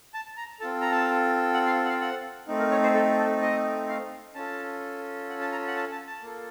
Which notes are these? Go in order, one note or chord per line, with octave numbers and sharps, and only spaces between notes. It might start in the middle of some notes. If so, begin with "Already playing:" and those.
A5
A#5
C4 F4 A4 A5
A#5
A5
F#5
F5
F#5
F5
F#5
A3 C4 D#4
A#4
C#5
C5
A4
A4
D#5
F5
C#4 F4 A4 A5
F#5
A5
A#5
F#5
A5
A5
A5
A#3 F4 A4